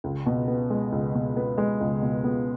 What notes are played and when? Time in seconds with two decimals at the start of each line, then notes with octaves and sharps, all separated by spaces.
0.04 C#2
0.26 B2
0.47 B3
0.70 G#3
0.92 C#2
1.15 B2
1.36 B3
1.58 G#3
1.81 C#2
2.02 B2
2.24 B3